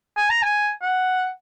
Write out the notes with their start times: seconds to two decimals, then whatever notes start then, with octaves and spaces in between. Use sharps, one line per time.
0.16 G#5
0.30 A#5
0.42 G#5
0.82 F#5